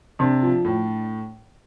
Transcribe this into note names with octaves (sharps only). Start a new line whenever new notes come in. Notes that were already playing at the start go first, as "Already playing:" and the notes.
C3 D4
F3
A2